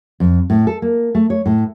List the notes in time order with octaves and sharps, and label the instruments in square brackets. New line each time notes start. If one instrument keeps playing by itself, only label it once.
[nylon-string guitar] F2
A2
A4
A#3
A3
C#5
A2